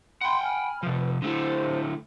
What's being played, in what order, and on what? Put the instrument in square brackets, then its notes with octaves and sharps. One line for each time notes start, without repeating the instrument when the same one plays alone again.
[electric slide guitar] F#5 G5 [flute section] B5 C6
[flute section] G#5 B5 F6
[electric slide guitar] C3 F3 [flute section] B4
[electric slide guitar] D3 A3 E4 [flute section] G4 C5